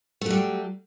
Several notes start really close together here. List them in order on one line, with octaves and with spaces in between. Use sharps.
A3 F#3 G3